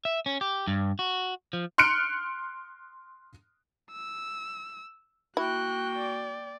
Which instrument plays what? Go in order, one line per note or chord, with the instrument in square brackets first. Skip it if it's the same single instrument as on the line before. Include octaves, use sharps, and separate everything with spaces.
[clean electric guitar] E5
C#4
G4
G2
F#4
F3
[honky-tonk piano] C6 F6 F#6 C#7 D7
[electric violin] E6
[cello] A#3 G5 [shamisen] E4 [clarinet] F#4 [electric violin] F#6
[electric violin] D5